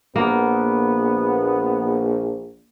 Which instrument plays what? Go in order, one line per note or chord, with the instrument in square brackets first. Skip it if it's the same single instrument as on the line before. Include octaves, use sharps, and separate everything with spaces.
[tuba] A#1 [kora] A#3 [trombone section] B3